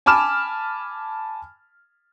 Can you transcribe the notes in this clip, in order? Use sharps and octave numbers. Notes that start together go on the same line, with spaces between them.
G#5 A5 B5 D6 F6 E7